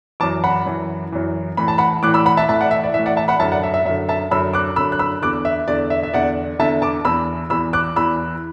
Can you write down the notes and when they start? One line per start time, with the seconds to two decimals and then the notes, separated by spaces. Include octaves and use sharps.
0.20 F#2 E3 A5 D6
0.44 F#5 B5
0.66 F#2 E3
1.12 F#2 E3
1.57 A2 E3 B5
1.68 A5
1.78 F#5 B5
2.03 A2 E3 D6 F#6
2.14 B5 E6
2.25 F#5 B5
2.37 E5 A5
2.49 A2 E3 E5 A5
2.61 D5 F#5
2.71 E5
2.83 D5
2.94 A2 E3 E5
3.06 D5 F#5
3.17 E5 A5
3.28 F#5 B5
3.39 F#2 D3 E5 A5
3.52 D5 F#5
3.63 E5
3.74 E5
3.85 F#2 E5
3.89 D3
4.09 E5 A5
4.31 F#2 D3 B5 E6
4.53 D6 F#6
4.76 F#2 D3 B5 E6
4.92 F#6
4.99 B5 E6
5.22 E2 D3 D6 F#6
5.45 E5
5.68 E2 D3 D5
5.90 E5
6.03 E5
6.14 E2 D3 D5 F#5
6.59 E2 D3 E5 A5
6.82 A5 D6
7.05 E2 E3 B5 E6
7.50 E2 E3 B5 E6
7.73 D6 F#6
7.96 E2 E3 B5 E6